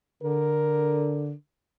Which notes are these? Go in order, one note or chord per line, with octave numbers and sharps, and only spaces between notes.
D3 A#4